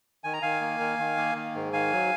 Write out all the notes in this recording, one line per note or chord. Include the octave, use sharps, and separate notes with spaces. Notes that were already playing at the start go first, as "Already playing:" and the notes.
D#3 G#5
A#5
D#3 F5 G#5
A#3
D#3
D#3
A#3
D#3
G#2
D#3 F5 G#5
F#3